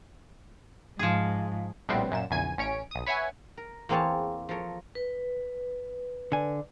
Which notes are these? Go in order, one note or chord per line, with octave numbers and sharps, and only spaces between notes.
G#2 F3 G#4
A#1 A2 G3 B3 C4
F#2 A#2 E7
A#1 E2 C#3 G#5 G#6 D#7
A1 C#4 C#5 D7
B1 D#6
B4 C#5 E5 F#5 G#5
A#4
E2 A#3 C4 G#4 C#5 A5
F3 A4 A#4 C#5
B4
D3 G#5